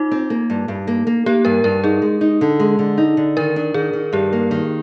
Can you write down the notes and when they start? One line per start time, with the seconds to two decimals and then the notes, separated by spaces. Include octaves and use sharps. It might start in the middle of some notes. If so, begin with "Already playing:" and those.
Already playing: D#4 F4
0.11 C4
0.30 A#3
0.50 G2
0.68 G2
0.87 A#3
1.07 A#3
1.26 A#3 G4
1.45 G2 A#4
1.64 G2 A#4
1.84 D#4 G#4
2.02 G#3
2.21 D#4
2.41 D3
2.60 G#3
2.79 D3
2.98 D#4
3.17 D3
3.37 D#3 A#4
3.56 D4
3.74 D#3 G#4
3.93 D#3
4.12 G2 G4
4.33 A#3
4.51 D#3